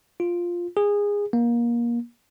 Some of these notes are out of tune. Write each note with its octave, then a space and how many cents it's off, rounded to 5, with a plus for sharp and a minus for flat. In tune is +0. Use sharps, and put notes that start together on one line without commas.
F4 +0
G#4 -20
A#3 +25